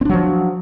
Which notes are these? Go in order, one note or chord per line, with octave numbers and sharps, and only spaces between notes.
F3 F#3 C4 D4